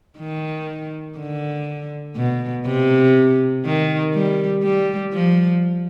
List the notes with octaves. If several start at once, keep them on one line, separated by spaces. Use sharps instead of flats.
D#3
D3
B2
C3
D#3
G3
G3
F3